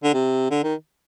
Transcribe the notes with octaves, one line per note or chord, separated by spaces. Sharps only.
D3
C3
D3
D#3